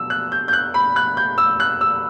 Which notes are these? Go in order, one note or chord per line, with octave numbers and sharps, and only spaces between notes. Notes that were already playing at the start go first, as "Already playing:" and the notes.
Already playing: B2 F#3 E6
F#6
G6
G6
F#6
B5
F#6
G6
E6
F#6
E6